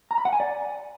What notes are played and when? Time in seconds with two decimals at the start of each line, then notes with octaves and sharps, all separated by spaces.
0.11 A#5
0.18 B5
0.25 F#5
0.33 G#5
0.40 D5